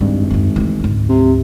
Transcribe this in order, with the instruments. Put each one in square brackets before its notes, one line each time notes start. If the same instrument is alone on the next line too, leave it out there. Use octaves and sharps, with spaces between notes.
[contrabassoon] G#1 [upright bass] G2
[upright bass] F#2 D#4
E3 A3
D2 G#2
[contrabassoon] C3